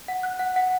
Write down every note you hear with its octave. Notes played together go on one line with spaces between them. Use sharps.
F#5
F#6
F#5
F#5